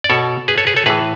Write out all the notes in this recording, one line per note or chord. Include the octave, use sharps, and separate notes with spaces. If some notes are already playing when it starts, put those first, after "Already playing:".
D5
B2 A4 C#5
G#4 B4
A4 C#5
G#4 B4
A4 C#5
A2 E3 G#4 B4